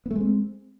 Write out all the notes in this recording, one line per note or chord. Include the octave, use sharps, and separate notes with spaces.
G#3 A3 B3 C4